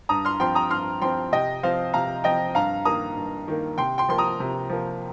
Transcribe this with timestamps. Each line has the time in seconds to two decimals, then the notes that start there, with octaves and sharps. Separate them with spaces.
0.09 G2 A#5 D#6
0.25 C6 F6
0.40 F3 C4 G5 C6
0.55 A#5 D#6
0.71 G2 C6 F6
1.01 F3 C4 G5 C6
1.32 C3 D#5 G5
1.63 F3 C4 C5 F5
1.94 C3 F5 A#5
2.24 F3 C4 D#5 G5
2.55 G2 F5 A#5
2.85 D#3 A#3 A#5 D#6
3.16 G2
3.48 D#3 A#3
3.78 C3 G5 C6
3.98 G5 C6
4.09 F3 A#3 C6
4.18 A#5 D#6
4.40 C3
4.69 F3 A#3